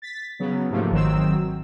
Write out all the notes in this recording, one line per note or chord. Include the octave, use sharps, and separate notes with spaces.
A6 B6
C#3 F#3 B3
G#2 C3 F3 A3 A#3
G#1 D#3 F#3 C4 E6